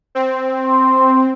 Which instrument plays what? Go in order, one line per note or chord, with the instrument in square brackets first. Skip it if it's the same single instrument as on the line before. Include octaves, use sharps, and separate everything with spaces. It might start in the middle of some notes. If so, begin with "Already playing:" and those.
[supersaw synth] C4
[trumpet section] C6